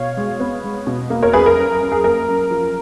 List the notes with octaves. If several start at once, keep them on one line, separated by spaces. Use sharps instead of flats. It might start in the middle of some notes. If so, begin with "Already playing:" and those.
Already playing: B2 C#5 F5
G#3
B3
G#3
B2
A#3
A#4 C#5
F#2 G#4 B4
A#4
F#2
F#2
G#4
A#3 A#4
F#2
F3